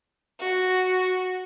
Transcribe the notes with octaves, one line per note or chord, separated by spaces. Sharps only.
F#4